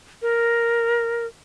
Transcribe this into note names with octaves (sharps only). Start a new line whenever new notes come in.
A#4